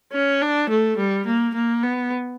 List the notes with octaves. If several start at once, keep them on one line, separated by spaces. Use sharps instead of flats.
C#4
D4
A3
G3
A#3
A#3
B3